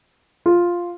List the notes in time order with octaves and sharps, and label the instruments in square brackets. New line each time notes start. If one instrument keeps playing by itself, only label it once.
[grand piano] F4